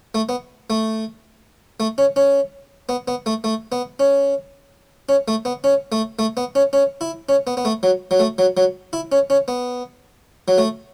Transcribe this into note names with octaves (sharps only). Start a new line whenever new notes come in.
A3
B3
A3
A3
C#4
C#4
B3
B3
A3
A3
B3
C#4
C#4
A3
B3
C#4
A3
A3
B3
C#4
C#4
E4
C#4
B3
B3
A3
F#3
F#3
A3
F#3
F#3
E4
C#4
C#4
B3
F#3
A3